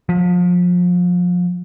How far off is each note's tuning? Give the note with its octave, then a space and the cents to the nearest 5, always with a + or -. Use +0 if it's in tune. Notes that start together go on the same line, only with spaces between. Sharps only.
F3 +30